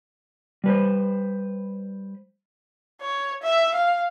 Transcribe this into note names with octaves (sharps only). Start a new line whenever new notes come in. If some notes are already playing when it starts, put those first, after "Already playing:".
G3 B4 C5
C#5
E5
F5